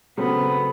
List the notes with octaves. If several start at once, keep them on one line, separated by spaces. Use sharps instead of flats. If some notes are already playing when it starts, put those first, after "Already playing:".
C#3 F#3 A3 B3 C4